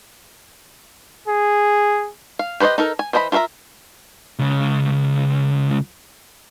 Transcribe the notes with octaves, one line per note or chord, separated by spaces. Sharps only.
G#4
F5
G4 B4 C5 D5 D#5
D#4 A4 A#4
G#5
E3 C5 D#5 A#5 B5
F4 A#4 C5 E5 A#5
C#2 C#3